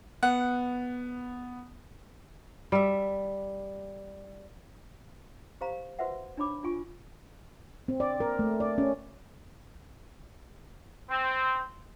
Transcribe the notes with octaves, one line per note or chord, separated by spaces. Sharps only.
B3 F#5
G3 E5
G4 C5 F5 A#5
F#4 B4 C5 E5 F#5
D4 D#4 C#5 B5 D6
D4 F4 G#5 C#6
C4
D5
A#4
A3
D5
C#4
C4